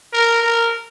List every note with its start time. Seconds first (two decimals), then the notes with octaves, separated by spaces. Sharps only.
0.13 A#4
0.43 A#4